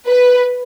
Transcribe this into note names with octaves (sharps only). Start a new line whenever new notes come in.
B4